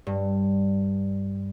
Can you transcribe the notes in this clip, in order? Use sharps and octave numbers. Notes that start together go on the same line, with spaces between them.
G2